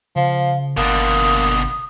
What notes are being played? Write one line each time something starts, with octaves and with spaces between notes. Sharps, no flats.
C#3 F3 F5
G1 B2 D3 A#3 D#6